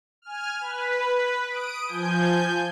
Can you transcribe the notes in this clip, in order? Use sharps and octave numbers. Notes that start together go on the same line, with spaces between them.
G#5 F6
B4
D#6 D7
F3 G#5 G6